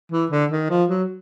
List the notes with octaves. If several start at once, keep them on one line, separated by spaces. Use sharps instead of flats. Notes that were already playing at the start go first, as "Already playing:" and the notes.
E3
D3
D#3
F3
F#3